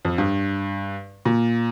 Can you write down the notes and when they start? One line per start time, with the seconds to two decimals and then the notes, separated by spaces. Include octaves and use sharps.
0.05 F2
0.18 G2
1.25 A#2